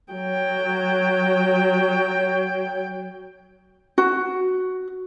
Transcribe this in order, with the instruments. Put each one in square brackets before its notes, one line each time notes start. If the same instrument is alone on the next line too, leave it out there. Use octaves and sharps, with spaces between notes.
[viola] F#3 G5
[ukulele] F#4